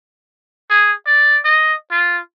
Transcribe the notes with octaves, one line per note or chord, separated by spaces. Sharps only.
G#4
D5
D#5
F4